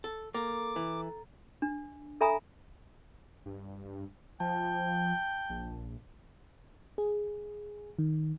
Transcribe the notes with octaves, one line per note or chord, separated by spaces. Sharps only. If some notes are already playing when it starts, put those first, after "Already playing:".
A4
A#3 A4 A#5 D6
E3
D4
A4 E5 G#5 A#5 B5 D#6
G2
F3 G5 A5
A#1
G#4
D#3